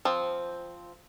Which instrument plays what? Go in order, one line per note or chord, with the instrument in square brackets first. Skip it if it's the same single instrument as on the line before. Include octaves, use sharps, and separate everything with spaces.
[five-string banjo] F3 C4